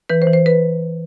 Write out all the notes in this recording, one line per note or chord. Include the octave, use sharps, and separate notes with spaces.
E3 B4
C5
E3
C5
B4